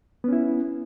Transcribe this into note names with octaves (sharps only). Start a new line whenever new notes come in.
B3 C#4 E4